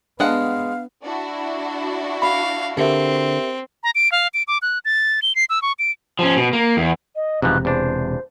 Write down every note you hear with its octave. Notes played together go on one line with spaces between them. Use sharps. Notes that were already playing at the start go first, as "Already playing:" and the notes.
G#3 B3 D4 F5 F#5
D4 E4 F#4
F5 B5
D3 C4 G4 A#4 E5
A#5
D7
F5
D7
D6
F#6
A6
G7
C7
E6
C#6
D7
F3 C#4
B2
A#3
E2
D#5
E1 G#2 C3 E3 F3 F#6
E2 D4 C5